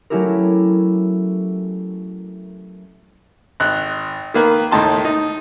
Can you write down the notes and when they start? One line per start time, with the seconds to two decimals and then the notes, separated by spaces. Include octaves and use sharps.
0.10 F#3 A3 C#4 E4 G4 A#4
3.60 G#1 F#6
4.34 D#3 A#3 B4
4.72 D#2 A2 D#4 A5 C6
5.05 D#4